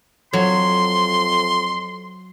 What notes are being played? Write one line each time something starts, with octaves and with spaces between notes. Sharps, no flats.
F2 F#3 C6